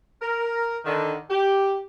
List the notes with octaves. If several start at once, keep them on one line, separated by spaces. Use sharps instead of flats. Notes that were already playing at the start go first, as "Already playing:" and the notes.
A#4
D3 D#3
G4